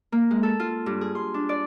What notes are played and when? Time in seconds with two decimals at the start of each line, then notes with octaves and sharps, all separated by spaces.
0.12 A#3
0.31 G#3
0.43 A4
0.60 F4
0.86 G2
1.01 G#4
1.15 C6
1.34 D4
1.49 D5